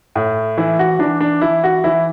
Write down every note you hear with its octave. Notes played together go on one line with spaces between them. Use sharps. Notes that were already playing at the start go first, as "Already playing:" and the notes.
A2
E3 E4
F#4
E3 D4
D4
E3 E4
F#4
E3 E4